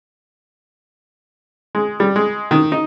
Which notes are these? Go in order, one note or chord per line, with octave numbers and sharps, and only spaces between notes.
G#3
G3
G#3
D#3
D#4